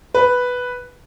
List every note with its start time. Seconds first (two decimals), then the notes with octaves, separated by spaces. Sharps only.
0.14 B4